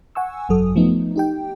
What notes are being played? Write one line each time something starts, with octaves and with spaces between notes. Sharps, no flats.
F#5 G#5 C#6 E6
G#1 F#2 F#3 A4 D#6
F3 A3 B3 D#4
D#4 G4 G5